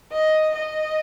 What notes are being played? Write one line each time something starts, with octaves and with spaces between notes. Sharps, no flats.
D#5
D#5